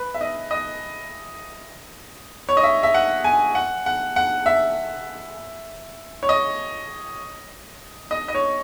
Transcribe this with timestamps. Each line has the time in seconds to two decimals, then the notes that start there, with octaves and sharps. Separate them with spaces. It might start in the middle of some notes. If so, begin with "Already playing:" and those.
Already playing: B4
0.14 E5
0.21 D#5
0.51 D#5
2.49 C#5
2.57 D#5
2.64 E5
2.83 E5
2.94 F#5
3.24 G#5
3.55 F#5
3.86 F#5
4.16 F#5
4.46 E5
6.23 C#5
6.29 D#5
8.11 D#5
8.28 D#5
8.35 C#5